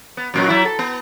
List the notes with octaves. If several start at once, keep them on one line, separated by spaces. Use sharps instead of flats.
B3
F#2 A#2 F#3
F#3 E4
A4
B3